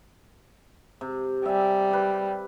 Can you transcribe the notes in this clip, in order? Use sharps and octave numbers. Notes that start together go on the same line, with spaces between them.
C3
G3 E5 G#5
G4 B4